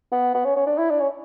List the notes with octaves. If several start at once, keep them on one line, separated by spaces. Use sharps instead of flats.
B3
B3
C#4
C#4
D4
E4
D4
C#4